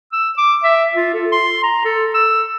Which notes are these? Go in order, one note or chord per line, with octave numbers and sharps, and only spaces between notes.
E6
D6
E5
F4
A4
C6
A#5
A4
E6